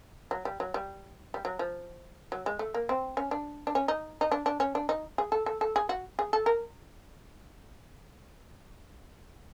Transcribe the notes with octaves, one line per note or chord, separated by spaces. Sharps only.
F#3
G3
F#3
G3
G3
F#3
F3
F#3
G#3
A3
A#3
C4
C#4
D4
D4
C#4
D#4
D#4
D4
D4
C#4
D4
D#4
G#4
A4
A4
A4
G#4
F#4
G#4
A4
A#4